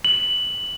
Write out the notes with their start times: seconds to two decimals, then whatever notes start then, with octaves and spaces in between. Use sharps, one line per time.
0.05 F#7